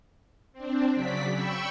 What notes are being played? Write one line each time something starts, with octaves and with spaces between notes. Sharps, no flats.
C4 D4
C#3 F#3 D5 B6
G5 B5 C#6 E6